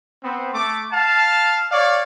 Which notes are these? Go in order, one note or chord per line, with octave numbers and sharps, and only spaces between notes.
B3 C4
A3 D6
F5 A5
C#5 D5 F5